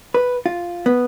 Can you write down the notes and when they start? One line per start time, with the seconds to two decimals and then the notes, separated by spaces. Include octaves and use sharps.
0.14 B4
0.46 F4
0.86 B3